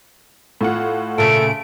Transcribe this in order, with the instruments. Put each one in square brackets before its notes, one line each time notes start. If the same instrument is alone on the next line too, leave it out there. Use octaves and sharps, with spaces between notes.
[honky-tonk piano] A2 F4 F#5
[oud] A#2 C#3 [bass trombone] A3 [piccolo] D7